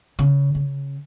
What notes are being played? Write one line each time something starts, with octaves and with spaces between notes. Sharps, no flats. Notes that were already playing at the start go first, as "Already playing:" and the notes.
C#3
C#3